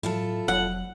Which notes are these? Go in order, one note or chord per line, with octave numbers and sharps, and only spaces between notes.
A2 F#3 E4 F4 A4
F1 F#3 F#5